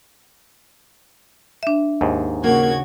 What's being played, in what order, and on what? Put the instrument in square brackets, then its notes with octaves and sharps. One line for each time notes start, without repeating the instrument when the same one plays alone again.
[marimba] D4 E5
[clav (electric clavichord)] D#2 G#2
[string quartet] C#3 F#4 G#6 [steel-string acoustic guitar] A#3